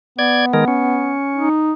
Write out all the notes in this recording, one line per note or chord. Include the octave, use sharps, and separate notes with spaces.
B3 D5 G#6
D#3 G#3 A#4
C#4
D#4